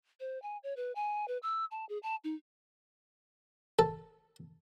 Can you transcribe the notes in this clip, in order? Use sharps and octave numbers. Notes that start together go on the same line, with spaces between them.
C5
G#5
C#5
B4
G#5
B4
E6
A5
G#4
A5
D#4
A4